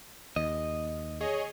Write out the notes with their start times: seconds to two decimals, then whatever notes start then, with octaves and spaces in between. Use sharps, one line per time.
0.36 D#2 D#5
1.21 G#4 C#5 D#5